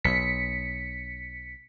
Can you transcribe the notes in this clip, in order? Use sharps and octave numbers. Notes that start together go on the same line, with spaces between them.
B1 B6 C#7